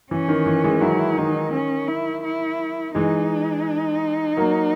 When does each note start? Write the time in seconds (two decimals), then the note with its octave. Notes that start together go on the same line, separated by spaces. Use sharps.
0.11 E3 C#4
0.28 D#3
0.46 E3
0.64 E3 G#3
0.81 D#3 F#3 E4
1.17 D#3 D#4
1.53 C#4
1.88 E4
2.24 E4
2.95 E3 G#3 D#4
4.37 F#3 A#3